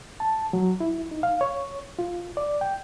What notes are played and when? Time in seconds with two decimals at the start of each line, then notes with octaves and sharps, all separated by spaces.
0.20 A5
0.53 F#3
0.80 E4
1.11 D#4
1.23 F5
1.41 C#5
1.99 F4
2.37 D5
2.61 G5